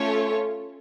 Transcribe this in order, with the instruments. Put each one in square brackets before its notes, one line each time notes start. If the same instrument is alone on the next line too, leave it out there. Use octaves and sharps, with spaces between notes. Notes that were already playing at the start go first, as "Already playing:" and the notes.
Already playing: [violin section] A3 C#4 F4 A4 C#5